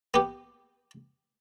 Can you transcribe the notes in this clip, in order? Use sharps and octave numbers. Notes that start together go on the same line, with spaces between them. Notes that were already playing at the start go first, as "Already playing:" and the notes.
B3 G4